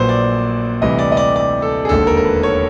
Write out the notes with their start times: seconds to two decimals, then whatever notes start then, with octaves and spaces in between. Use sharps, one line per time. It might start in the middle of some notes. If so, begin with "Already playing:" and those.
Already playing: A#1 A#2 F#3 B4 C5
0.09 D5
0.81 D2 C3 E3 G3 D#5
0.99 D5
1.12 D#5
1.17 D5
1.36 D5
1.62 A4
1.85 G#4
1.89 E1 D#2 D3 A4
2.07 A#4
2.17 A#4
2.25 B4
2.43 C#5